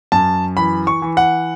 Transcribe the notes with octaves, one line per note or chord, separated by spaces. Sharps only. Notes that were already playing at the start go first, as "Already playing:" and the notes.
F#2 A5
E3 B5
C#6
E3
F#5